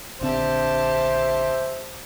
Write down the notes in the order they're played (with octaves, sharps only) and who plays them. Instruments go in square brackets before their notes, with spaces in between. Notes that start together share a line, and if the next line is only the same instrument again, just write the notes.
[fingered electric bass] A#1 D3 C4 [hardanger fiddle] G4 A5 [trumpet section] C5 E5